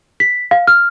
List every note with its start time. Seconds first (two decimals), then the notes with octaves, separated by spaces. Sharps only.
0.20 B6
0.51 F5
0.67 F6